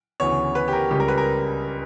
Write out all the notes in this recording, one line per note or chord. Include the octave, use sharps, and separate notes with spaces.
D2 C#3 E3 B3 C#5
B4
G4
A#4
C#2 C#3 G3 C#4 G4
A#4
B4
A#4